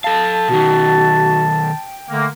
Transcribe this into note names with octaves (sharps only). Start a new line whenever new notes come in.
A4 F5 A5
B2 D#3 F#4
G5
D3 A3 A#3